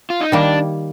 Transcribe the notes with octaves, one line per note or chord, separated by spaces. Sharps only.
F4
D#4
D#3 G3 A#3 D4